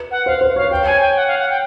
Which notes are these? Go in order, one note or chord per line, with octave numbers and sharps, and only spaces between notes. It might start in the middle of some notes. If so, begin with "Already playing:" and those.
Already playing: B4
F#5
C5 F5
C5
C#5 F5
C#5 G5
G#5
G5
F#5
F5
F#5
G5